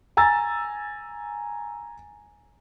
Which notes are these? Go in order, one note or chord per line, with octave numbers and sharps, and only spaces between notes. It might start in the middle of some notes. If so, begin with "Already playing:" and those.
G#5 A#5 E6 A6